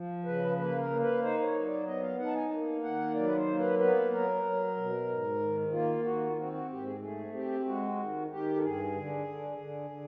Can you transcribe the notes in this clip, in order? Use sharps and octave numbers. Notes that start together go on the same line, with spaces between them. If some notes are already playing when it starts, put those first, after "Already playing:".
Already playing: F3
C#3 B4
A#3 B4
A#4
A#3
B4
D#4 C5
C5
C#5
F#3
D5
B3 D#5
F5
D#4 F#5
A5
G#5
A#3
D#3 F#5
F#3 D5
B4
C5
A#3
B4
B3 B4
F#3 A#4
F#3
B2
G#2
D#3
A#3 F4
D#3 F#4
F4
C4 F#4
F#4
G#2 G4
G#4
A3 G#4
C4 G4
G#3 F#4
D#3
D#3 G4
A4
G2 G#4
D3
D3
D3
D3